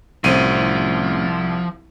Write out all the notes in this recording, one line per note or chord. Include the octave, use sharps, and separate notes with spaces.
C2 A2 F3 C4 C#4 D#7